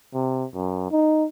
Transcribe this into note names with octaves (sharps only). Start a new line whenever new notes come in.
C3
F#2
D#4